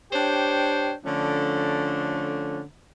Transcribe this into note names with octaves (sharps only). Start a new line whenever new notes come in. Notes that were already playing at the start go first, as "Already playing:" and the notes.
D4 G4 C5 C#5 G5
D3 F3 A3 C#4 D4